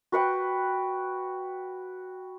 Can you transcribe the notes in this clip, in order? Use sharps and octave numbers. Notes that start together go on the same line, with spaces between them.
F#4 B4 F#5 G5